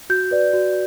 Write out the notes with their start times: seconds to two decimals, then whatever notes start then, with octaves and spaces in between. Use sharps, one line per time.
0.10 F#4 G6
0.31 B4 D5
0.53 F#4